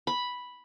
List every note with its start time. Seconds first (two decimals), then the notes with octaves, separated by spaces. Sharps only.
0.07 B5